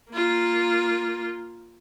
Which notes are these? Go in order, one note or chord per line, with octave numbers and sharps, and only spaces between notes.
A#3 F4